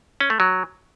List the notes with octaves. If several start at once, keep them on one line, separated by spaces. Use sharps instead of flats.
C#4
A3
F#3